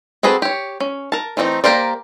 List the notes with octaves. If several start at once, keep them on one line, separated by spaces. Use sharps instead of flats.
C4 F#4 G#4 A4 B4
G4 C#5
C#4
A#4 A5
E3 A3 C4 D4 D#4
A#3 G4 A#4 C5 D5